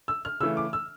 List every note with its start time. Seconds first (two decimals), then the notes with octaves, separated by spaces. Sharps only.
0.08 E6
0.25 F6
0.40 C#3 E3 A3 E6
0.57 D6
0.73 E6